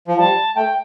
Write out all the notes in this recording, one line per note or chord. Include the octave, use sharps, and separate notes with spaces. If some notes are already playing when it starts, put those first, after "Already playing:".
F3
G3 A5
A3 G5